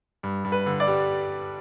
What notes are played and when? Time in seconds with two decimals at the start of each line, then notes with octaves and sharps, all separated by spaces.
0.23 G2
0.44 G2
0.52 B4
0.66 D3
0.80 D5
0.87 G3